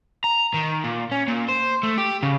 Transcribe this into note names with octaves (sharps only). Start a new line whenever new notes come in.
A#5
D#3
A#2
C#4
A#2
C5
A3
G4
C#3